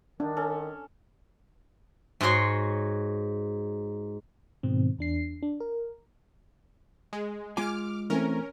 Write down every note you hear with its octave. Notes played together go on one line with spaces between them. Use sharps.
D#3 D4
C#4 A4
G#2 F#4 G#4 C#5 C6
G#2 B2 D#3 C4
E2 D4 C7
D4
A#4
G#3
G#3 F4 G#5 D6 F6
E3 A3 C4 C#4 A#4